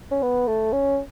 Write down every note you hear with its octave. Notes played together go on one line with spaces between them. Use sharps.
C#4
B3
A3
C#4